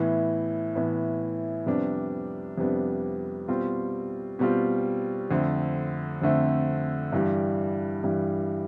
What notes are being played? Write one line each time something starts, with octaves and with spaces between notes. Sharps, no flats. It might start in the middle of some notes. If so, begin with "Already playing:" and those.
Already playing: A2 E3 B3 E4
A2 E3 B3 E4
F2 C3 G3 B3 D4
F2 C3 G3 B3 D4
B2 G3 C4 F4
B2 G3 C4 F4
F2 D3 A3 C4
F2 D3 A3 C4
G2 E3 G3
G2 E3 G3